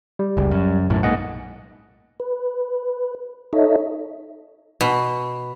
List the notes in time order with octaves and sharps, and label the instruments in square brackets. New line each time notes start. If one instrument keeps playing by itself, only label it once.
[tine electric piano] G3
[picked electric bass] F#1 C#2
F#2
B1 F#2 A2
[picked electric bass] B1 G#2 [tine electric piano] A#3 D#5 F#5
[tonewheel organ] B4
D#4 A4 C#5 D#5 E5
[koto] B2